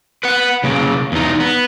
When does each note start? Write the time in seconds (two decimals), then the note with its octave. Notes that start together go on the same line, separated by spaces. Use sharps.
0.23 B4 F#5
0.63 C#3 A#3
1.12 E2 D#4
1.40 B3